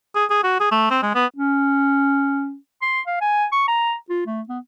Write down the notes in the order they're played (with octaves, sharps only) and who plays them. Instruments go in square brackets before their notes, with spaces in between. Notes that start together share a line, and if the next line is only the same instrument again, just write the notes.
[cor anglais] G#4
G#4
F#4
G#4
A3
C4
G#3
B3
[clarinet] C#4
C6
F5
G#5
C#6
A#5
F4
A3
B3